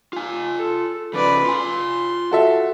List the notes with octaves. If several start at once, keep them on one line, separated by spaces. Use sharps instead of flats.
F4 G#5
A4
C#3 F3 B4 D5
F4 G#5 C6
F#4 A4 E5